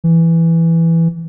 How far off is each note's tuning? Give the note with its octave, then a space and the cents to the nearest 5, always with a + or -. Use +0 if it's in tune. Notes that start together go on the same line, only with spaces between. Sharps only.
E3 +5